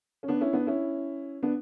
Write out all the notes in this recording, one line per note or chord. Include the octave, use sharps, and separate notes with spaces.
C#4
B3 D4
C#4 E4
B3 D4
C#4 E4
B3 D4